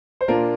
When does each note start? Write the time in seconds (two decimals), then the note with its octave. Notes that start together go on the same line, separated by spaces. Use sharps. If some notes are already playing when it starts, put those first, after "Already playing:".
0.21 C5
0.28 A#2 A#3 D4 F4 A#4